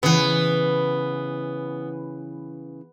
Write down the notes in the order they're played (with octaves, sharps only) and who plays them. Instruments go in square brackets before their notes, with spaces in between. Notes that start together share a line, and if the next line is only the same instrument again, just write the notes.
[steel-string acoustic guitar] C#3 E3 [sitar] B3